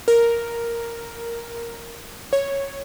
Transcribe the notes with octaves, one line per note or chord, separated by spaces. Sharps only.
A#4
C#5